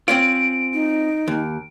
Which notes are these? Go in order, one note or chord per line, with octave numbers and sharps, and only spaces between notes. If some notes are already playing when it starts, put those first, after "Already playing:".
C4 C#4 F4 D7
D#4
D#2